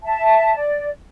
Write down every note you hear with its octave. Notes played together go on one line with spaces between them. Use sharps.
E5 A5
D5